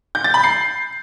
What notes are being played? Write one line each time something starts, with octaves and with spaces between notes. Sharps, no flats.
G6
A6
B5
C7